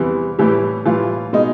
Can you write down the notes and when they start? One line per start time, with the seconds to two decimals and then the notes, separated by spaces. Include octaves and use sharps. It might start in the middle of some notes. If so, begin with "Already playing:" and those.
Already playing: E2 C3 E3 G3
0.38 A2 E3 G3 G4
0.85 A2 E3 G3 F4
1.33 B2 G#3 D#4